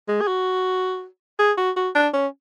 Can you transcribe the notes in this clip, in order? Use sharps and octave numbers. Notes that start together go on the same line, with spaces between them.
G#3
G#4
F#4
G#4
F#4
F#4
D4
C#4